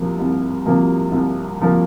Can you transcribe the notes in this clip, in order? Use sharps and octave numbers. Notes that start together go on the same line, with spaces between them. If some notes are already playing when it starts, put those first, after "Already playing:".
Already playing: C2 C3 F3 A#3
C2
C3 F3 A#3
C2
C3 F3 A#3